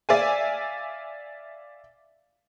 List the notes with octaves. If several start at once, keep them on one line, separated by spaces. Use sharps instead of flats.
D5 E5 F5 G#5